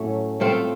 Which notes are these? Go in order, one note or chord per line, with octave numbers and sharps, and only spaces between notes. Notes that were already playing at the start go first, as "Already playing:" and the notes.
Already playing: A2 F#3 A3 C#4
A3 C4 F4 A4